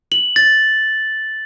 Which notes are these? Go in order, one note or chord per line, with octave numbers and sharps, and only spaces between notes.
F#7
A6